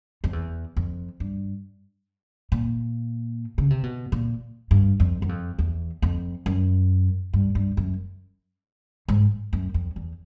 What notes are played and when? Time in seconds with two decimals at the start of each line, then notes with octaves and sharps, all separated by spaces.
0.24 F2
0.33 E2
0.76 F2
1.20 G2
2.52 A#2
3.58 C#3
3.70 C3
3.83 B2
4.12 A#2
4.71 G2
5.00 F2
5.22 F#2
5.29 F2
5.59 E2
6.02 F2
6.46 F#2
7.33 G2
7.55 G2
7.77 F#2
9.08 G#2
9.53 F#2
9.74 F2
9.96 E2